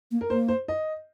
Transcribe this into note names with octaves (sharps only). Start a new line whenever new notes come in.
A#3
A#4
A#3 C5
C5
D#5